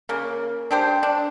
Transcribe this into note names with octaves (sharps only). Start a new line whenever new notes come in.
C#3 A#3
D4 G4 C5
D4